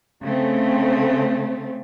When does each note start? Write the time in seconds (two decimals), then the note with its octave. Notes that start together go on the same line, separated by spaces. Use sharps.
0.22 C#3 A3 C4